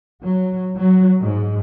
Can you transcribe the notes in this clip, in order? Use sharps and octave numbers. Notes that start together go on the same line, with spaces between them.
F#3
F#3
G#2